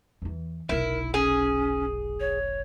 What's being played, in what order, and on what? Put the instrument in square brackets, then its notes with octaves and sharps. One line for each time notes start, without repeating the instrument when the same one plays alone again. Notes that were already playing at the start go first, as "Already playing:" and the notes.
[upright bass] E2 E3
[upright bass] F1 B1 [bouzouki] E4 [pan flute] A#4
[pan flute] C#4 [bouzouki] G#4
[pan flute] C#5